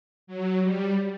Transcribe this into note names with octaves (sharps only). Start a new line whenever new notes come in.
F#3
G3